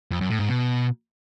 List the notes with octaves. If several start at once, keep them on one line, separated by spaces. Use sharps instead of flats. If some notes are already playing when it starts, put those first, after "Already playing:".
F2
F#2
A2
G#2
B2